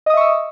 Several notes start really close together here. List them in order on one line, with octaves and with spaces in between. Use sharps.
D#5 D#6 E5 C#6 E6